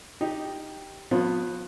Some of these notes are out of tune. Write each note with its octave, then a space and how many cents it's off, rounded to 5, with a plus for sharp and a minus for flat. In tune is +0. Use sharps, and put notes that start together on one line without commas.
D#4 +0 G4 +0
F3 +40 B3 +0 F4 +0